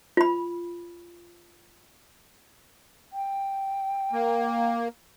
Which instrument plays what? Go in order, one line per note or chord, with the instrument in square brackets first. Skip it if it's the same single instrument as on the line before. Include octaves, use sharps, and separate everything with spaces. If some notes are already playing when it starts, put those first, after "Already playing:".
[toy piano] F4 B5
[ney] G5
[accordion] A#3